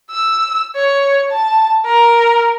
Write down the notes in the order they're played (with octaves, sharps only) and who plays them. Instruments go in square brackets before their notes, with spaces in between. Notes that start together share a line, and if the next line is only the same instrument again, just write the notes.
[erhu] E6
C#5
A5
A#4